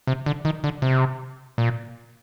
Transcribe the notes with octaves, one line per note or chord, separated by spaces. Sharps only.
C3
D3
D#3
D3
C3
A#2